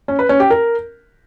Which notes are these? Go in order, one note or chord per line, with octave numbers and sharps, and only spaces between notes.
C#4
B4
C#4
G4
A#4